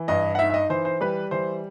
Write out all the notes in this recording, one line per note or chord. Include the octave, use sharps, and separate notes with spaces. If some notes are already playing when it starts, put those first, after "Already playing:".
Already playing: E3
G2 D#5
F#5
D#4 E5
E5
D#5
E3 C5
C5
G3 B4
E3 C5